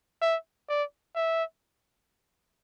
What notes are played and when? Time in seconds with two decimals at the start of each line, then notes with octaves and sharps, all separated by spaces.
0.22 E5
0.69 D5
1.15 E5